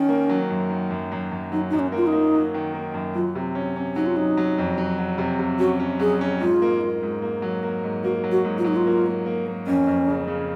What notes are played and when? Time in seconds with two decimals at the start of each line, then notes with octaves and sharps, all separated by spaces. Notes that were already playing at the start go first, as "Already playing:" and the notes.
Already playing: D#3 C#4
0.09 A#3
0.29 F#3
0.50 F#2
0.70 D#3
0.90 F#2
1.12 F#2
1.31 F#2
1.52 F#3 D#4
1.70 F#2 D#4
1.79 C#4
1.92 A#3 F4
2.07 D#4
2.12 A#3
2.34 F#3
2.54 D#3
2.74 A#3
2.94 F#2
3.15 F#3 F4
3.35 C3
3.55 C#4
3.76 C#4
3.96 F#3 D#4
4.06 F4
4.16 F#3 D#4
4.37 F#3
4.58 F2
4.78 F#3
4.98 F#3
5.18 C3
5.39 C3
5.59 C#4 F#4
5.80 C#4
5.99 F#3 G#4
6.21 C#4
6.40 G#2 F4
6.62 A#3
6.81 A#3
7.03 G#2
7.22 A#3
7.42 F#3
7.63 A#3
7.83 G#2
8.04 A#3 F#4
8.24 F#3
8.32 F#4
8.44 G#2
8.58 F4
8.64 F#3 D#4
8.76 F4
8.86 A#3
9.06 A#3
9.26 A#3
9.47 A#3
9.67 F2 C#4
9.87 F2
10.08 C#3
10.27 C#3